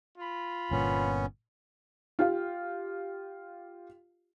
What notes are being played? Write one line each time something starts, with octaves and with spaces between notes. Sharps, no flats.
F4 B5
G1 A#2 B3 C#4
F4 G4 F5